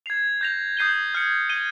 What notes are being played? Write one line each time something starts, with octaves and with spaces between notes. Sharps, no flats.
G#6 C7 F7
G6 A#6 F7
D#6 G6 C7 D#7 G7
F6 G#6 C#7
G#6 D#7 G7